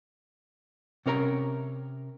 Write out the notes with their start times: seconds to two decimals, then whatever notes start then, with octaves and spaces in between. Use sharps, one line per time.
1.06 C3 C#4 A#4 C5 A#5